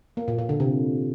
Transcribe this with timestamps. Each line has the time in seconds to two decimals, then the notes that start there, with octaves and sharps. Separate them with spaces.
0.17 A#3
0.28 A#2
0.38 A#2
0.49 D3
0.60 C3